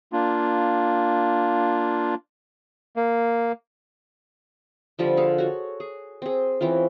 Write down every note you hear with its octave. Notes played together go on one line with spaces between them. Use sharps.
A#3 D4 F4
A#3
D3 F3 G3 F4
G#4 A4 F5
F#4 C#5
G#4
C4 G#4
E3 C4 C#4 F4